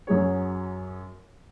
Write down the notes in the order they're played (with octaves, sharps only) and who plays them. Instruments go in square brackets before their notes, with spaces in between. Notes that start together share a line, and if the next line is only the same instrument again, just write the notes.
[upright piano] F#2 F#3 G#4 C#5